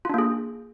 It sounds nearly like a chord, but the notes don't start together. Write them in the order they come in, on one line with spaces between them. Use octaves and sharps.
F4 D4 A#3 G#4